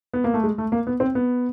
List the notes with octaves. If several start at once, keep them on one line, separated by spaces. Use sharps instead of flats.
B3
A#3
A3
G#3
A3
A#3
B3
C4
B3